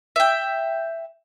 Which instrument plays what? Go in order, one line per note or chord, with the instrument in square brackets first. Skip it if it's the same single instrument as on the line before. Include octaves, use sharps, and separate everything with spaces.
[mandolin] E5 G5